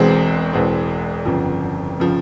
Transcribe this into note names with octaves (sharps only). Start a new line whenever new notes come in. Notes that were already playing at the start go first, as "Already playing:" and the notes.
Already playing: E1 E2 B2 G#3 C4
E1 E2 B2 G#3 C4
G1 F2 C#3 F3
C#3 F3